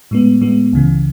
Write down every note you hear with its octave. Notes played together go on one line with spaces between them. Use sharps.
A2 G#3 B3
A2 G#3 B3
C#2 C#3 E3